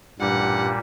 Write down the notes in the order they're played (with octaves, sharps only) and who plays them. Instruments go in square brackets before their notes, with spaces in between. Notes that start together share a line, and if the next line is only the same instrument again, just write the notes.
[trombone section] A1 G2 [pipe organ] A#2 G3 [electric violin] F#5